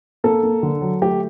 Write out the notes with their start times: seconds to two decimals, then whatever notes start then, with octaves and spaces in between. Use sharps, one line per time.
0.24 A#3 A4
0.43 A#3
0.63 D3
0.82 F#3
1.02 A3 G4